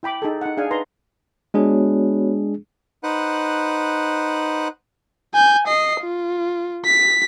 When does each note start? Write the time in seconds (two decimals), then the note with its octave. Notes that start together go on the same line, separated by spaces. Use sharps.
0.03 E4 G5 B5 D6
0.22 D#4 G#4 A4
0.41 D#4 F#5
0.57 D4 G#4 F5 G#5
0.71 D#4 B4 A#5 C6
1.54 G#3 B3 D4 F#4 G#4 C#5
3.03 D#4 B4 C5 F#5 F#6
5.34 G#5 G6
5.67 D#5 C7
6.01 F4
6.85 B6